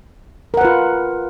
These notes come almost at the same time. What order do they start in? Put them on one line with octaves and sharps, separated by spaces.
A#4 F#5 B4 F4